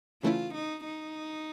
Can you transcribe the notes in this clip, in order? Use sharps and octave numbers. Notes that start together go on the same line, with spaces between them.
C#3 E3 A3 C#4 E4 F4
D#4
D#4